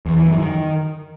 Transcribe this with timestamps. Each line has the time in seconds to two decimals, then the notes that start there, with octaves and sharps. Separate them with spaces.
0.06 E2
0.17 E3
0.28 F#2
0.39 D#3